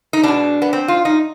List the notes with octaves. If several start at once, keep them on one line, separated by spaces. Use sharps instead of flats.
D#4
B2 G#3 D4
B3
C4
F4
D#4